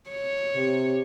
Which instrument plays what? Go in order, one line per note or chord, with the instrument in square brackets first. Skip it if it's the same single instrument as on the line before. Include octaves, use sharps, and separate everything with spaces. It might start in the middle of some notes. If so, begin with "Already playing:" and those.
[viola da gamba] C#5
[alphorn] C3